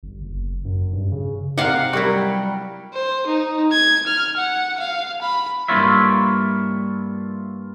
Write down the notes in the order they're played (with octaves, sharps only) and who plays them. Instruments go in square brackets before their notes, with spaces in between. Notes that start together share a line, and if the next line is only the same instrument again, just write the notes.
[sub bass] G1
F#1
F#2
G2
C#3
[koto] C3 A#4 [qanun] F5 F#5
[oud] F#3 G4 A#4 [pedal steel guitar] G3 [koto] E4 F#4
[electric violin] C5
D#4
G#6
F6
F#5
F5
B5
[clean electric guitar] G2 A#3 E4 F4 C#5 E5